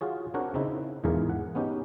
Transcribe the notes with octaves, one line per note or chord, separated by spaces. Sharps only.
F4 F#4 G#4 C#5
C4 D4 F#4 A#4 C#5 F#5
C#3 C4 D#4 E4
E2 G#2 E3 F4 G#4 A#4
F#5
B3 C#4 D#4 G4